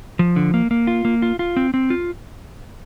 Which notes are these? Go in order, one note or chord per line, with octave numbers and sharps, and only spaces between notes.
F3
D3
A#3
A#3
F4
A#3
F4
F4
C4
C4
F4